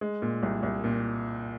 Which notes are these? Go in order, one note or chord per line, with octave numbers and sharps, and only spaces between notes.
G#3
A#2
C2
C2
A#2